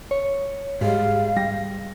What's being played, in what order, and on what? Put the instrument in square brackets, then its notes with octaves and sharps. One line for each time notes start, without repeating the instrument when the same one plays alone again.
[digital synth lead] C#5
[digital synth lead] G#2 [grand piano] G3 G#3 [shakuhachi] F5
[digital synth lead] G3 [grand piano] A#6